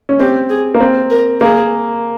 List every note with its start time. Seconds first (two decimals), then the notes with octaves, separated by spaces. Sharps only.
0.09 C#4
0.20 C4 G4
0.50 G#4
0.74 A#3
0.80 C4
1.11 A#4
1.41 A#3 G#4